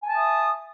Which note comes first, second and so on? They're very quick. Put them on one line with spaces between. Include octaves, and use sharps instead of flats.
G#5 A5 E5 D#6